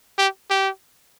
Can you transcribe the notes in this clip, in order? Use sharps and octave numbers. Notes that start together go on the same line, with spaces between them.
G4
G4